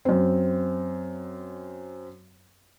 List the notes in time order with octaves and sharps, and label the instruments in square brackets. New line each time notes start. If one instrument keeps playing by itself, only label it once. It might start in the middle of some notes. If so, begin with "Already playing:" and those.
[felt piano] F#2 C4